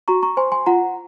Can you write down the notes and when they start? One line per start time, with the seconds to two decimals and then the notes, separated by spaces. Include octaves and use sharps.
0.08 F#4 A#5 C#6
0.22 A#5 C#6
0.37 C5 G#5 C6
0.52 G#5 C6
0.66 F4 F#5 A#5